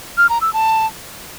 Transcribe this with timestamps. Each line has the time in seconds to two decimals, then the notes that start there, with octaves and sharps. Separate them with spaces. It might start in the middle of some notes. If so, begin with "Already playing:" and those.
0.17 F6
0.29 A#5
0.41 E6
0.53 A5